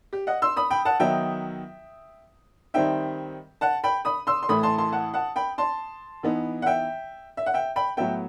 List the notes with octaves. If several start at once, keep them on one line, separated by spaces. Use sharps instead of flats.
G4
D#5 F#5
C6 E6
B5 D#6
G5 B5
F#5 A5
D#3 F#3 B3 D#4 E5 G5
D#3 G3 C4 D#4 E5 G5
F#5 A5
G5 B5
B5 D#6
C6 E6
C6
A2 E3 A3 E4 B5 D#6
A5 C6
A5 C6
F#5 A5
F#5 A5
G5 B5
A5 C6
E3 B3 D#4
F#5
E5 G5
E5
F#5
E5 G5
G5 B5
A2 F#3 B3 E5 G5